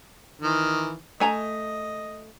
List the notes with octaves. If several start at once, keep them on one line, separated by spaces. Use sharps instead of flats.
D#3 E3
A3 D#5 G#5 A#5